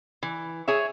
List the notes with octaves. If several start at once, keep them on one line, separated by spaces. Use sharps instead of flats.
E3
G#4 C#5 E5